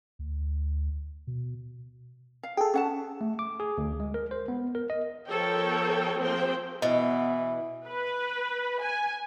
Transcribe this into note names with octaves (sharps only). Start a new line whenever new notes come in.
D2
B2
F5
G#4 A4 G5
C#4 F#5 A5
A3
D6
G#4
D2
G#3
A#4
C5
B3
A#4
D#5
F3 B3 A4 A#4 C#5 G5
F3 A#3 C4 G#4 C5 G5
B2 E3 B3 D#5
B4
G#5